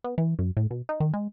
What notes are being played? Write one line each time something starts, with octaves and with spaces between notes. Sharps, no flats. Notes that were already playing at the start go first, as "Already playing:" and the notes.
B3
E3
F#2
A2
B2
D#4
D#3
G#3